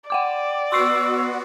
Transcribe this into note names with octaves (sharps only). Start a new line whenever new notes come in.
D5 F#5 G5 D6
B3 F#4 C6 C#6 E6 C7